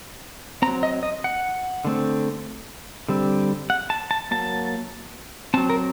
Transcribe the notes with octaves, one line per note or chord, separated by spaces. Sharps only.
C4 A#5
F#3
D#5
D#5
F#5
D3 A3 C4
D3 G3 C4
F#5
A5
A5
F#3 A#3 A5
F#3 C4 A5
A#4